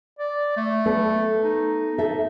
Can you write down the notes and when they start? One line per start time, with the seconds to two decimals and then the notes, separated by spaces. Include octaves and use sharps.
0.19 D5
0.57 A3
0.86 B3 A4
1.44 D#4
1.98 A4 E5